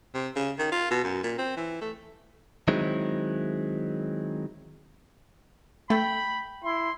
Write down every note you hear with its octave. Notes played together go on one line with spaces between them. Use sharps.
C3
C#3
D#3
F4
B2
F#2
A#2
C4
E3
A3
D#3 F#3 G#3 C4 E4
A3 G5 B5
E4 C6